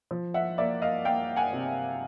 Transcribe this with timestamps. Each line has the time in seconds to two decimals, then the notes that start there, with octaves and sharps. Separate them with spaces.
0.11 F3
0.34 E5 F#5
0.58 A#3 D5 E5
0.82 D#5 F5
1.05 A#3 F5 G5
1.36 F#5 G#5
1.53 C3